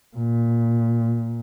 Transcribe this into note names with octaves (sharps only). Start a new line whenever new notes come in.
A#2